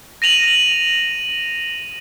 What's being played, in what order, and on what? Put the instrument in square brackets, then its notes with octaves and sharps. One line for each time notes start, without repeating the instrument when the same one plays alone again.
[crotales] A#6 D#7 F7 F#7